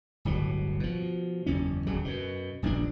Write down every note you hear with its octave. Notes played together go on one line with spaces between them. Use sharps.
D1 G1 B2 F#3
B2 F3
F#1 E2 C#4
D#1 C#3 F#3
F#2 B2
D#1 A#1 G2 D4